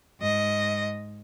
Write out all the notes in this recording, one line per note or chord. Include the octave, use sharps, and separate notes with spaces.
G#2 D#5